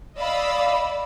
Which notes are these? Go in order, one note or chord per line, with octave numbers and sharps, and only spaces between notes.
D5 D#5 F5 B5 E6